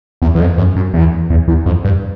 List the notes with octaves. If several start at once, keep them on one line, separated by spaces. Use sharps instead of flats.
E2
E2
F2
F#2
F#2
E2
E2
E2
F2
G2